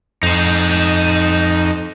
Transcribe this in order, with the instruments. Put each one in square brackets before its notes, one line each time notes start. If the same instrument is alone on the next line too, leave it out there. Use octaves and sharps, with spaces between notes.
[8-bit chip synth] F2 [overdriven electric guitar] D#4 C5